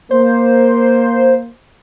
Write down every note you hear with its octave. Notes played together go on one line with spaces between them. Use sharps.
A#3 C5